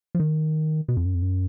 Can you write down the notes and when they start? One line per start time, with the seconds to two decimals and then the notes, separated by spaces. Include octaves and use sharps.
0.15 F3
0.20 D#3
0.88 B2
0.97 F2
1.05 F#2
1.14 F2
1.22 F#2